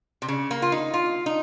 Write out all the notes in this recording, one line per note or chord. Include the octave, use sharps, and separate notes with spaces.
C3
C#3
A#3
F4
D#4
F4
D#4